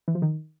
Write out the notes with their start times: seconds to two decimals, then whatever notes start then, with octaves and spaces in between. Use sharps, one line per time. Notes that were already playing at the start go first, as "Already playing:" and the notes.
0.08 E3
0.15 F3
0.22 D#3